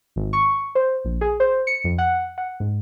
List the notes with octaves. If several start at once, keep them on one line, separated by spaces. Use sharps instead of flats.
G#1
C#6
C5
A#1
G#4
C5
C#7
F2
F#5
F#5
G#2